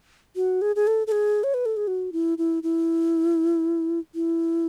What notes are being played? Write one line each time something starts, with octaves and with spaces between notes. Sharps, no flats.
F#4
G#4
G#4
A4
A4
G#4
C#5
B4
A4
G#4
F#4
E4
E4
E4
E4